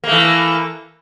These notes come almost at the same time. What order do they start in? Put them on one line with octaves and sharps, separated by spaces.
A#3 A3 E3